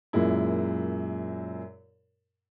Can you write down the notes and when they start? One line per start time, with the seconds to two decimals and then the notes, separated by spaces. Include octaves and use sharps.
0.13 F#2 A#2 G#3 E4